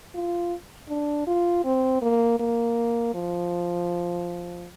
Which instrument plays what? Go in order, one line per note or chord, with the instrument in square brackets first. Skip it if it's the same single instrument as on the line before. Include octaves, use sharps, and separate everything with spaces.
[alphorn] F4
D4
F4
C4
A#3
A#3
F3